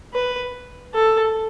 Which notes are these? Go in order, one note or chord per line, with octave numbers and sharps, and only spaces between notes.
B4
A4